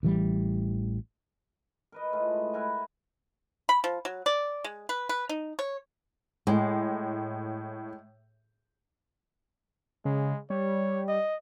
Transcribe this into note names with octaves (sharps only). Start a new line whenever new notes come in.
A1 E3 G3
A#4 B4 D#5
A2 G#3 A3 F4
E4 A#4 F#5 G#5
B5
F3
F#3
D5
G#3
B4
B4
D#4
C#5
A2 G#3
C#3 G#3
G3 C#5
D#5